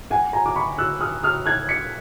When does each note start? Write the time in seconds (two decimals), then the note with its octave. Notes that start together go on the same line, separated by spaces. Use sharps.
0.10 F#5 G#5
0.33 G#5 A#5
0.46 D6
0.56 B5 C#6
0.78 E6 F#6
1.00 D#6 F6
1.23 D#6 F6
1.46 F#6 G#6
1.69 B6 C#7